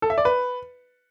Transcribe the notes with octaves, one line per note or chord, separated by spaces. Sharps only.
A4
E5
D5
B4